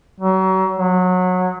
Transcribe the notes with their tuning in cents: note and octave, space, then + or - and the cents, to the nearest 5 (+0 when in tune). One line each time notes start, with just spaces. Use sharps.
F#3 +35
F#3 -20